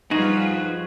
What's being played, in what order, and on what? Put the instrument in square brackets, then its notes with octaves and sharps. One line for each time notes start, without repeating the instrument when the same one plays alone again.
[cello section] G2 F4 B4 [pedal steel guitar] F3 F#4 G#4 [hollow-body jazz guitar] D#4